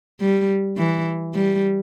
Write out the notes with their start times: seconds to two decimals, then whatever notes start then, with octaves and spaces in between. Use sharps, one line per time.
0.21 G3
0.77 E3
1.34 G3